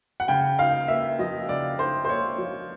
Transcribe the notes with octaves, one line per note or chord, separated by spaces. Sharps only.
F#5
C#3 G5
D#4 F5
A#3 E5
F3 D#5
C#3 D5
D#4 C5
C5
A#3 C#5
F3